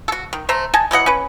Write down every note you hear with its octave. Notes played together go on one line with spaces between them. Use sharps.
F#4 A4
D#3
A3 C5 E5 A#5
D#5 G#5 A5
E3 F#3 D#5 F#5
C#4 B4